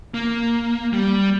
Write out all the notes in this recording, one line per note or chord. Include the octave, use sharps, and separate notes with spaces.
A#3
G3